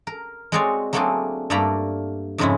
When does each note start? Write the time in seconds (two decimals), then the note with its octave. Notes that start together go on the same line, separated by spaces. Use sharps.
0.07 A#4
0.52 G#3 C4 F#4 G#4 C#5 D5
0.93 F#3 A3 A#3 C4 D4 G#4
1.50 G2 A3 A#3 D5 A#5 B5
2.38 F2 G#2 C#3 G#3 C#4 E4